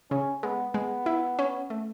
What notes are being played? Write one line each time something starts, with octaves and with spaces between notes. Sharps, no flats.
C#3 C#4
G#3 B3
G#3 B3
E4
C#4
A3